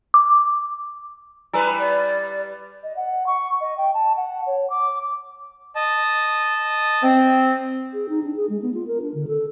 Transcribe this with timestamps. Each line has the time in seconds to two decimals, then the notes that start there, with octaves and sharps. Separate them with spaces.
0.14 D6
1.53 G3 E4 B4 G#5 E6
1.79 D5
2.83 D#5
2.96 F#5
3.26 C#6
3.60 D#5
3.77 G5
3.94 A5
4.16 F#5
4.46 C#5
4.70 D6
5.76 D#5 A5
7.03 C4
7.93 G#4
8.09 D#4
8.23 D4
8.36 G#4
8.49 G#3
8.62 B3
8.74 F4
8.87 A#4
9.02 D4
9.14 D3
9.27 A4